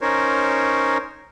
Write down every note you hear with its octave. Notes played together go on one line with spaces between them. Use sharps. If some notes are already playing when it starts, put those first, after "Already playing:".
C#4 D#4 A#4 C5 C#5